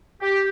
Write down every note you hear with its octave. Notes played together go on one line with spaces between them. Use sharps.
G4